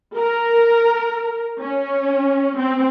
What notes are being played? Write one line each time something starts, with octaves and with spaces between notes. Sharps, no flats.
A#4
C#4
C4